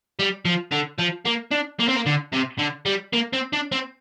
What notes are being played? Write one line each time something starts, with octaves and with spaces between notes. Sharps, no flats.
G3
F3
D3
F3
A#3
D4
A#3
C4
A#3
D3
C3
D3
G3
A#3
C4
D4
C4